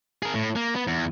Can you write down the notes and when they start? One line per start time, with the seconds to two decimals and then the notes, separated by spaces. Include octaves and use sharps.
0.23 G#4 A#4
0.35 A2
0.56 A#3
0.75 B3
0.88 E2